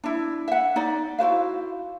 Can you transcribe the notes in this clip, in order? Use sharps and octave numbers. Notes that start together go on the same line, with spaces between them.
D4 E4
E5 F#5
D#4 D5
E4 F#4 C5 F5